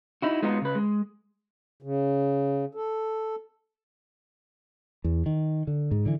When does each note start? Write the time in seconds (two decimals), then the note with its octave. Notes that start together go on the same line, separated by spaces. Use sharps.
0.22 D#4 E4 F#4
0.43 G#3 B3 D#4 F4 F#4
0.62 C#3 B4
0.75 G#3
1.82 C#3
2.75 A4
5.04 E2
5.26 D#3
5.67 D3
5.91 G#2
6.06 D3 E3